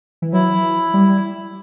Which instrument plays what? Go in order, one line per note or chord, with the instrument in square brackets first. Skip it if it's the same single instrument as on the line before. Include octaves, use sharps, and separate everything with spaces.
[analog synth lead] E3
[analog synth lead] F#3 [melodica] E4
[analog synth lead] G3